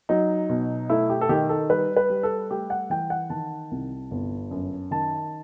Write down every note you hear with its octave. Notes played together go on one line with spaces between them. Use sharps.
F#3 D#4
B2
A3 E4
G4
A4
D#3 G4
A4
G3 B4
B4
G3
A4
A3 G4
F#5
E3 G5
F#5
D#3 A5
C2
G1
F#2
D#3 A5